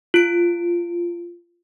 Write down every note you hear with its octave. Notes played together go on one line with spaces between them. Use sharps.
F4 D7